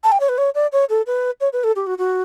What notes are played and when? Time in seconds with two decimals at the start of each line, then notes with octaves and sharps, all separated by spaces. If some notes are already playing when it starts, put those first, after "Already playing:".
0.04 A5
0.12 G5
0.20 C#5
0.29 B4
0.38 C#5
0.55 D5
0.72 C#5
0.90 A4
1.07 B4
1.41 C#5
1.53 B4
1.64 A4
1.76 G4
1.87 F#4
1.98 F#4